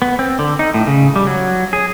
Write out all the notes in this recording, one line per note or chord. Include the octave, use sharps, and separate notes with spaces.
B3
C4
D3
D#4
A2
C#3
G3
F#3
G#4